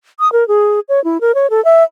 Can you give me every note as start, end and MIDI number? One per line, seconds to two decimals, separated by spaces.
0.20 0.31 87
0.32 0.47 70
0.48 0.80 68
0.89 1.03 73
1.04 1.20 64
1.21 1.34 70
1.35 1.50 73
1.50 1.63 69
1.65 1.84 76